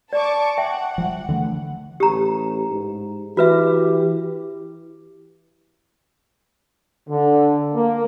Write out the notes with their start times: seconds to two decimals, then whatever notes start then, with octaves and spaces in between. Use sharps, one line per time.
0.13 D5 A5 C#6 D6
0.58 E5 F#5 G5
0.98 F3 G3
1.29 D3 E3 A3
2.00 A1 G4 A#5
2.70 G#2
3.37 E3 F#4 G4 B4 E5
7.09 D3
7.74 A#3